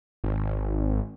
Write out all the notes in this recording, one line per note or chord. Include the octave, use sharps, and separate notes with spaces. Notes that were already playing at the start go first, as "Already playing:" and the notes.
G#1